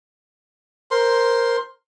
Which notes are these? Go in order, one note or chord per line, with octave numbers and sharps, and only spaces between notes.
A#4 C5 C6